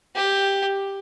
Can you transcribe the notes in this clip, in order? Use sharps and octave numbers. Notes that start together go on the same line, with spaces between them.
G4